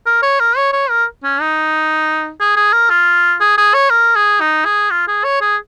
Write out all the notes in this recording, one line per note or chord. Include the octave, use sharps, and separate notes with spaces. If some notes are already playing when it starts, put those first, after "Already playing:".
A#4
C#5
A#4
C#5
C#5
A#4
C#4
D#4
G#4
G#4
A#4
F4
G#4
G#4
C#5
A#4
G#4
D#4
G#4
F4
G#4
C#5
G#4